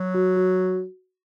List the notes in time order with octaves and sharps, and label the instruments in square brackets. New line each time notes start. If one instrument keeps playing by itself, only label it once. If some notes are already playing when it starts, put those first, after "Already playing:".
Already playing: [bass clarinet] F#3
[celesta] F#4
F#4